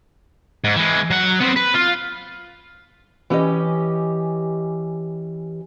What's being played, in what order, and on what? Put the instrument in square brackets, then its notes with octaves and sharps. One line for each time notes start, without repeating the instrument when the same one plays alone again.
[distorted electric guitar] G#2
E3 G#3
F#3 F#5
B3 C4
B4
F4
[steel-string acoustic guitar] E3 C#4 G4 D#5